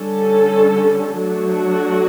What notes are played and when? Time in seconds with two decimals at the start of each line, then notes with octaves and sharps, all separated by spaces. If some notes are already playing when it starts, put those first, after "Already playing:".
Already playing: D3 G3 C#4 A4
1.22 F#3 A3 D4 F#4